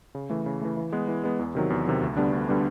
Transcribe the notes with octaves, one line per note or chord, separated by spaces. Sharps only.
C#3
E3 A3
C#3
E3 A3
E3
G#3 B3
E3
G#3 B3
E2
C3 D#3 F#3
E2
C3 D#3 F#3
D2
D3 G3 B3 D4
D2
D3 G3 B3 D4